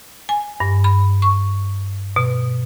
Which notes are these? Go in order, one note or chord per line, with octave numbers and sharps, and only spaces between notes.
G#5
G2
B5
C#6
B2